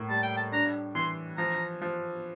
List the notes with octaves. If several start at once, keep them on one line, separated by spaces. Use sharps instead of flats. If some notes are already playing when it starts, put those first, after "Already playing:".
Already playing: A2 A#3
G3 A5
G5
A5
D4 A#5
E3 C6
F3 A#5
F3